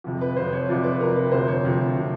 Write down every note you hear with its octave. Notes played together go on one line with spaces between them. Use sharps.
F2 C3 F3
B4
F2 C3 F3 C5
C#5
F2 C3 F3 D5
B4
F2 C3 F3 A#4
B4
D2 C3 F3 C5
C#5
D2 C3 F3
C3 F3